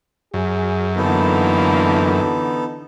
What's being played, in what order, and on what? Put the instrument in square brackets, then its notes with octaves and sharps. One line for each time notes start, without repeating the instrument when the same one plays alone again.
[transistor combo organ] F#2 [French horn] G#4
[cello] D3 E3 [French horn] A#3 [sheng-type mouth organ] B3 D#4 A4